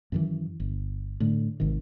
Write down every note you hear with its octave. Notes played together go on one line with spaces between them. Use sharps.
F#2 D#3 E3
G1
A2 D3
G#1 C3 D#3